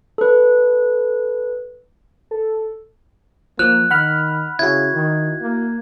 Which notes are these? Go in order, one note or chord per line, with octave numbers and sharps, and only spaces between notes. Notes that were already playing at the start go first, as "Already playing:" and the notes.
A4 B4
A4
F3 A#3 F#6
D#3 F#5 B5 F6
C#3 E4 F#4 G#6
D#3
A#3